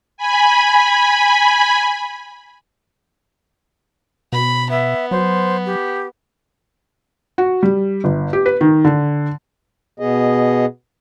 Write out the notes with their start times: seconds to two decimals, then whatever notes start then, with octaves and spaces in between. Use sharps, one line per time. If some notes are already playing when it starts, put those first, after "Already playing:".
0.17 G#5 B5
4.33 B2 B5
4.70 B3 E5
5.11 F#3 C5
5.66 G4
7.38 F#4
7.63 G3
8.04 G1
8.33 G4
8.46 B4
8.61 D#3
8.85 D3
10.00 B2 B3 G#4 D#5